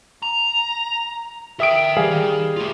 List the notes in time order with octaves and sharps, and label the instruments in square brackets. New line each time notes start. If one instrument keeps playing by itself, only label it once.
[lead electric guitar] A#5
[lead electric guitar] A#4 G5 [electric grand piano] E5 D#6 D7
[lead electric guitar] E3 [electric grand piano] G3 G#4 F5
[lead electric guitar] D#3
A3 F4